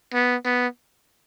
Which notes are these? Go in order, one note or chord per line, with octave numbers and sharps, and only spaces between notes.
B3
B3